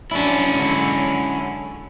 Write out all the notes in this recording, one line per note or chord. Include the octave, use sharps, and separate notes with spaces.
F#3 C#4 D4 E4
D3 F#3 G#3